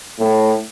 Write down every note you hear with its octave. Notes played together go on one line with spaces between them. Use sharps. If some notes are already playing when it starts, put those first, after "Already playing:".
A2